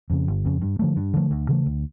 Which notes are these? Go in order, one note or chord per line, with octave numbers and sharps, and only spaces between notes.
F2 C#3
G1
F2 C#3
G2
D3 F3 A3
G2
D3 F3 A3
D2
C#3 E3 A3
D2